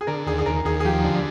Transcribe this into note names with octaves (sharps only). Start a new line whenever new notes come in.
G#4
D3 A#4
D#2 G#4
G#4
D#2 A#4
D#2 G#4
G#4
F3 G4
D3